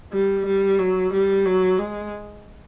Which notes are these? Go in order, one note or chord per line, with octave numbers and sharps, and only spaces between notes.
G3
G3
F#3
G3
F#3
G#3